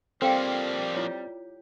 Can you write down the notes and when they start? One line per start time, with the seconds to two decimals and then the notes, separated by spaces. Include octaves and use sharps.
0.22 F3 G3 A#3 C4 A4 F5 G5
0.94 E4 F4 C#5